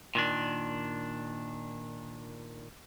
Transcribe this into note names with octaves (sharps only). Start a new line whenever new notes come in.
A#2 D#3 D4